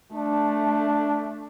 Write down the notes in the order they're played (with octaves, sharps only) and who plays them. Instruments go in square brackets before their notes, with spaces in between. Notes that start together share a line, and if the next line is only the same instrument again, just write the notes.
[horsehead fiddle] A3 [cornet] D4